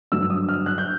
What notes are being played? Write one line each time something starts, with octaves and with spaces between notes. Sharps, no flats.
G2 D3 F#3 E6
D#6
F6
F#6
G6